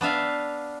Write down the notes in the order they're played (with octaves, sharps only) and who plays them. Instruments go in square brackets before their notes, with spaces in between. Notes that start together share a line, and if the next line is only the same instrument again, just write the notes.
[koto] B3 D4 E5 F5